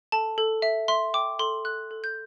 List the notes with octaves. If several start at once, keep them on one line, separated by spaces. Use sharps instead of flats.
A4 A5
A4
E5
E5 C6
G5 D6
A4 C6
A4 F#6
A4
G6